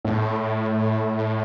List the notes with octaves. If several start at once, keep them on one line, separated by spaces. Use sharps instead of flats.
A2